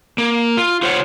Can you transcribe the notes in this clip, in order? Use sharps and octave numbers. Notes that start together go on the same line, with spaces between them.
A#3
F4
F4 C5 C#5 F#5